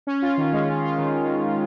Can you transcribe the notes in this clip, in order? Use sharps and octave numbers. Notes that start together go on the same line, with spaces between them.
C#4
F4
D#3
G#3
C#4
F4
D#3